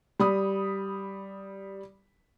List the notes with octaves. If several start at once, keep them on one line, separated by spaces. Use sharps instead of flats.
G3 B5 D#6